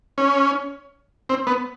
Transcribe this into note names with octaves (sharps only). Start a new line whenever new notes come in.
C#4
C4
B3